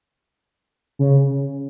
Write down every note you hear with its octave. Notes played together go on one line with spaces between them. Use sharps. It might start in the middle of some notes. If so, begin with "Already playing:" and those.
C#3